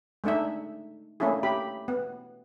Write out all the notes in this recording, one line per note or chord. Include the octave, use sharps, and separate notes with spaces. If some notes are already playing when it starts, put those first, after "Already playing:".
G#3 A3 D4 D#4 E5
A3 A#3 C#4 D4 E4 G#4
G4 B5
B3